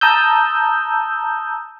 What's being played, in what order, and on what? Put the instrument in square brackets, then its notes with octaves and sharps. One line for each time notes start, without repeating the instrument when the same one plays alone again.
[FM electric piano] A5 A#5 D#6 E6 G6